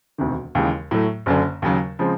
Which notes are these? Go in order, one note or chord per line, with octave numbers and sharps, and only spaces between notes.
E1 D2 C3 D#3
D#2 C#3 E3 G#3
A2 F#3 A3
F#1 F#2 D3
D#2 C#3 F#3
C#3 F3 G#3 C4